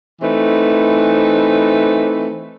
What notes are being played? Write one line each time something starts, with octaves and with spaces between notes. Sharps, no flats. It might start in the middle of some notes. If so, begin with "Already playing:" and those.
E3 A3 C4 D#4 B4